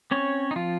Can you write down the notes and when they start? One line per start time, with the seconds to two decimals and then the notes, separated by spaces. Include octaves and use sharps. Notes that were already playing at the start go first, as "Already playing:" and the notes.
0.11 C4 C#4 C#5
0.51 D#4
0.56 F3 F4